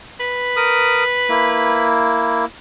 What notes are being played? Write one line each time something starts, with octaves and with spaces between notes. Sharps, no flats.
B4
A#4 D#6
A#3 E4